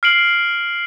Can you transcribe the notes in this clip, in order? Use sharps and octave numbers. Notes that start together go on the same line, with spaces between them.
F6 C7 D7 F#7